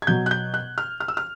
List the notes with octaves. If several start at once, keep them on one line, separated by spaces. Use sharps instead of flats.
G#6
B2 F#3 G6
F#6
G6
F#6
F6
F6
E6
F6